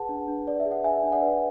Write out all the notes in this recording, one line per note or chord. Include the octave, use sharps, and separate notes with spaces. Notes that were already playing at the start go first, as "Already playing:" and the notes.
Already playing: G#4 B4 F#5 A5
D4
D4
B4 D5
E5
G#4
F#5
D4 E5 G#5
D4
D5 F#5
B4